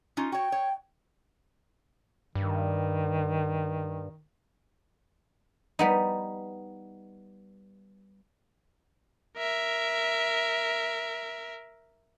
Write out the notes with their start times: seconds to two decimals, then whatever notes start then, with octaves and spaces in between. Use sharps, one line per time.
0.17 C#4 D#4 F4
0.32 F#4 C#5 G5
0.52 C#5
2.35 G2 D#3
5.79 G3 B3 D#4
9.37 A#4 E5